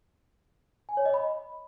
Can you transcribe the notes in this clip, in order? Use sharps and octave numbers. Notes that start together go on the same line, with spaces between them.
G#5
C#5
D#5
B5